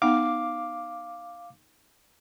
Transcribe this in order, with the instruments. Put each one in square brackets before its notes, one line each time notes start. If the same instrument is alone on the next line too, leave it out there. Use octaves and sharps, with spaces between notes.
[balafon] B3 D#4 F#5 [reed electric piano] F5 D6